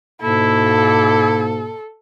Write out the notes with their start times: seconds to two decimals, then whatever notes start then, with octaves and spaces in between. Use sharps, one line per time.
0.22 G#2 B2 A#3 E4 A4